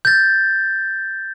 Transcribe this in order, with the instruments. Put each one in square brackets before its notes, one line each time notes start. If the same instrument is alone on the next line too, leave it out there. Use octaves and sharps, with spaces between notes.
[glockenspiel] G6 A6